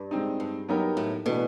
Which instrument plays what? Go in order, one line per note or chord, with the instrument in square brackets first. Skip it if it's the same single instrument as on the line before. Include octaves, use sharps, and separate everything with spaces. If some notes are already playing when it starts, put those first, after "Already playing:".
Already playing: [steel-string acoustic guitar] G2
[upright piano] G#3 C4 D#4
[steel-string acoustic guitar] G2
[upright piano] F#3 B3 D#4 G4 A#4
[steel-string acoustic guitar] A2
[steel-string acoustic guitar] B2 [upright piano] E3 A3 D4